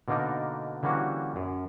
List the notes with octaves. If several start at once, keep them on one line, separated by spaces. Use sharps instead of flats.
B2 D3 A#3 D4 D#4 A#4
D3 E3 G3 A#3 C#4 F#4
F#2